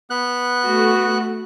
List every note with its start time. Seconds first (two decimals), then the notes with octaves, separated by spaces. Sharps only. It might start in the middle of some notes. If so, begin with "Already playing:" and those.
0.10 B3 F#6
0.64 A3 F#4